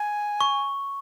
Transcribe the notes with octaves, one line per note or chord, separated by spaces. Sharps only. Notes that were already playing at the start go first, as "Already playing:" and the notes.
Already playing: G#5
C#6